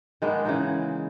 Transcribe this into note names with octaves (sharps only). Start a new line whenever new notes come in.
D#3 G#3 A#3 B3
C#3 E3 D#4